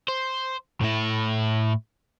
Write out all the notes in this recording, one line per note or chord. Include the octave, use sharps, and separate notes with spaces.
C5
A2 E4